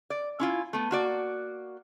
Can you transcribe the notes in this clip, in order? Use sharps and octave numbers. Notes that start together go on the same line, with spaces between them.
D5
C#4 E4 F4
A3 B3
A#3 F#4 D5